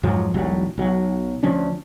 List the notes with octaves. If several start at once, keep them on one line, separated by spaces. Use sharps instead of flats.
F2 G#2 F3 F#3
E1 B1 F#3 G3
B1 F#3
D2 F3 C#4 D4